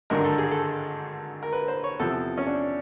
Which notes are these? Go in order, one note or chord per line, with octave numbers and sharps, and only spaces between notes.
G#1 G2 D3 A#4
A4
G#4
A4
A#4
B4
C5
C#5
E2 C3 F3 A4
C#4
D4